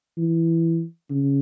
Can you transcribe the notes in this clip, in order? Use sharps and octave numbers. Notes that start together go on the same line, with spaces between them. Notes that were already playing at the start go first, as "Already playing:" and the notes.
E3
C#3